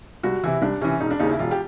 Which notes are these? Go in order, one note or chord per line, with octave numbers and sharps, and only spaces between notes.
C2 F#4
C3 E3 E4
C2 D4
C3 E3 C#4
E1 D#4
D4
D#2 C#3 D#4
E4
E1 F4
G4